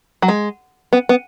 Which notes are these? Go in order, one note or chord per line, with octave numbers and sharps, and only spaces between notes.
F#3
G#3
B3
B3